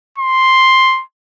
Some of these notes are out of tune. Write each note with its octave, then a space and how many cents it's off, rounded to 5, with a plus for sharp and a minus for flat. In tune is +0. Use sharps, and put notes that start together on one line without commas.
C6 +5